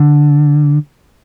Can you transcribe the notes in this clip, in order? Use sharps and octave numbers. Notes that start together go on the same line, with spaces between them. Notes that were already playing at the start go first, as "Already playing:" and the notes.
Already playing: D3